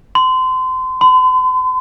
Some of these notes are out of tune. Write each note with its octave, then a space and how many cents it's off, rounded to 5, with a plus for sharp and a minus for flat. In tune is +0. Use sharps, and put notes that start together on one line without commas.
C6 -30
C6 -45